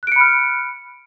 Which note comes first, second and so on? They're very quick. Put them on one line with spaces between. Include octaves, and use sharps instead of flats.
F#6 D7 C#7 B5 F6